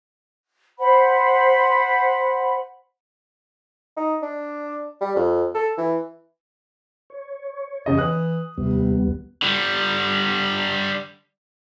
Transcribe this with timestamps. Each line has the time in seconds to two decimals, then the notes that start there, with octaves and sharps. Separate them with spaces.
0.79 C5 F#5 B5
3.97 D#4
4.22 D4
5.01 G3
5.16 F2
5.55 A4
5.77 E3
7.10 C#5
7.86 E1 F2 C#3 D#5
7.98 E3 D#6 F#6
8.58 D#2 C3 G3 B3
9.42 D3 G3